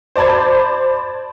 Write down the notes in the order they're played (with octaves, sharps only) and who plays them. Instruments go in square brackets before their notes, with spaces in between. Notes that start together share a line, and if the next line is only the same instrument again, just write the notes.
[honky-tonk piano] C5 D5 A5 B5 G#6